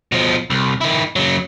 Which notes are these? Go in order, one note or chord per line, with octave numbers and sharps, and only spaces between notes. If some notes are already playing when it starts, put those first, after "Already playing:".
B2 F3
C2
D#3 E4
C#3 F#3